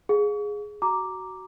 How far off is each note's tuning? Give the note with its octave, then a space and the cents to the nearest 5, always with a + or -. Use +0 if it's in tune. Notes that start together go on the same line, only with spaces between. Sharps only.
G#4 +0 F5 +30
F#4 +20 A#5 +0 D6 +0